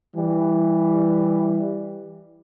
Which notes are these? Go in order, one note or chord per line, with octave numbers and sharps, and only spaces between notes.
E3 G3